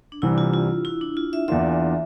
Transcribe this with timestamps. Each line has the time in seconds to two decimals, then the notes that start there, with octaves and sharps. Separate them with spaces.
0.12 D4
0.22 C2 C3 E3 G3 C4 E4
0.38 F4
0.53 F4
0.85 E4
1.01 D4
1.17 F4
1.33 E5
1.48 E2 E3 A#3 D4 F4 E5